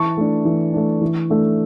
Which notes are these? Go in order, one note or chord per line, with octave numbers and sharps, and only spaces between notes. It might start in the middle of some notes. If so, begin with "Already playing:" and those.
Already playing: E3 A5 C#6
A3 D4
E3
A3 D4
E3
A3 D4